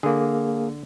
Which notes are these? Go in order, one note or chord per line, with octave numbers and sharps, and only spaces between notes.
D3 A#3 G#4